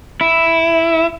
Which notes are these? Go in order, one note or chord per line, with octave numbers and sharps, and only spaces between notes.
E4